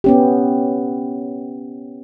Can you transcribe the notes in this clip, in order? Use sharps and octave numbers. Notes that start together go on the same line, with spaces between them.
B3 C#4 G4